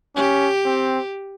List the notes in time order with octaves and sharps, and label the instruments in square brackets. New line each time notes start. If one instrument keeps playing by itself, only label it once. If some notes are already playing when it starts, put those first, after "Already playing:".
[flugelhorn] C#4 [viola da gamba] G4
[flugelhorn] C4